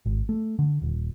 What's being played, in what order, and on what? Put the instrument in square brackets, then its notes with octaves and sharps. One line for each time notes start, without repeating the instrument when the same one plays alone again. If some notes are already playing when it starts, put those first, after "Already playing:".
[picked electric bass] G#1
A3
D3
D#1